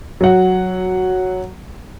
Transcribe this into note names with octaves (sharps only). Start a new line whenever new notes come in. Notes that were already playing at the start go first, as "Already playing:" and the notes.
F#3 F#5